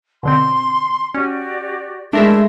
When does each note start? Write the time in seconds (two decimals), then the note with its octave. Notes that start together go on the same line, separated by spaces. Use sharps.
0.23 B2 D3 C4 C6
1.14 C#4 F#4 G4 D5
2.13 G#3 A3 D4 E4 A#4 D5 E5